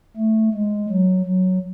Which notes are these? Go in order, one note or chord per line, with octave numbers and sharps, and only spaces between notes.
A3
G#3
F#3
F#3